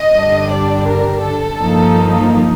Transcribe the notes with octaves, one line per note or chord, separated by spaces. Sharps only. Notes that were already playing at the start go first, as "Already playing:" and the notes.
Already playing: D#5
G2 D3 G3 D4
D5
A#4
A4
G2 F3 A#3 D#4